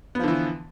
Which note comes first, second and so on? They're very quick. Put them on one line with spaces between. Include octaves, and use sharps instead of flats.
B3 F3 D3 E3